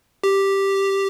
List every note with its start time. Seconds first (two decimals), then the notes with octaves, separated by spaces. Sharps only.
0.24 G4